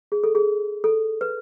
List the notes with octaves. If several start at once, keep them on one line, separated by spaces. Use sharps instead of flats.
G#4
A4
G#4
A4
B4